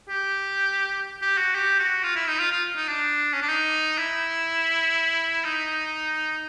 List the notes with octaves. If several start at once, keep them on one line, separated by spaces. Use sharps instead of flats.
G4
G4
F#4
G4
F#4
F4
E4
D#4
F4
F4
D#4
D4
C#4
D4
D#4
E4
D#4